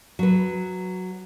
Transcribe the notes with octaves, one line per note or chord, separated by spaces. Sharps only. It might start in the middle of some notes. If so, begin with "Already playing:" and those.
F#3 B4